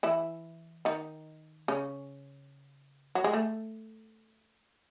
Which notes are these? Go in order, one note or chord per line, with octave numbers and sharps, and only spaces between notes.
E3 E4
D#3 D#4
C#3 C#4
F#3
G#3
A3